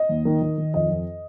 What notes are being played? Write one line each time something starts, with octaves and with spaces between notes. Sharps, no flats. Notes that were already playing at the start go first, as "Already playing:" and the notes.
Already playing: D#5
D#2
D#3
D#3
D#3
F2 D#5
F2